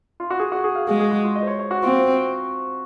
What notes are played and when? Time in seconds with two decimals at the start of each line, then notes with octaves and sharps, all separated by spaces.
0.20 F4
0.30 F#4
0.40 G#4
0.52 F#4
0.64 G#4
0.75 F5
0.87 G#3 G#4
1.00 G#4
1.11 F#4
1.24 F4
1.36 D#5
1.42 C5
1.47 C#5
1.60 C#5
1.71 F#4
1.83 C4 F4